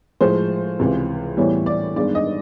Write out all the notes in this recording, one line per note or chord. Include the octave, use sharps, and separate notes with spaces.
A2 F3 G#3 C5
C#2 C3 E3
A2 E3 G3 B3 C#5
D5
G2 D#3 G#3 B3 D5
D#5